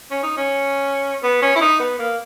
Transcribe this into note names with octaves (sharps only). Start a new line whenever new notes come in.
C#4
D#4
C#4
B3
C#4
E4
D#4
B3
A#3